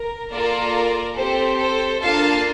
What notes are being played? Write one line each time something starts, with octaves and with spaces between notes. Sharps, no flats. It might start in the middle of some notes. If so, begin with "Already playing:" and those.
Already playing: A#4
A#3 F4 A4 A#4 D5
C4 G4 A4 C5
A4 C5
A#3 D4 F4 A4 F5 A5